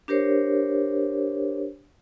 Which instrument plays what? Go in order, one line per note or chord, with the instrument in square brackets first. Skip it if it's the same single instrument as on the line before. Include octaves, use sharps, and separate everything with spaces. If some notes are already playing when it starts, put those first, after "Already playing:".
[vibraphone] D4 G4 A#4 C5 C#5